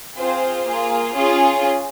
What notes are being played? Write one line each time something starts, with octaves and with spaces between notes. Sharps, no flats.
C4 F4 G#4 C5
A#3 F4 G#4
C#4 F4 G#4